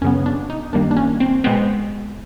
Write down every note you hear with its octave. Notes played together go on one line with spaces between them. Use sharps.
F#2 C#3 F#3 B3 C#4
D4
D#4
F#2 D#3 G3 A#3 D4
D4
C#4
C4
B2 G#3 B3 C4